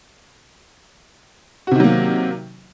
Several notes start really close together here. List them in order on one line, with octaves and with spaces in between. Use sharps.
F#4 C3 D#3 F#3 A#3